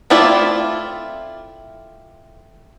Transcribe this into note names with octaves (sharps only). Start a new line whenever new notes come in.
A3 C4 E4 F4 D5